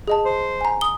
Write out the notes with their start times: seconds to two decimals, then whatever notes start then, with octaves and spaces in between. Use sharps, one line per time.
0.08 G#4 D#5 A5
0.25 C5
0.61 G#5 A#5
0.81 D#6 G7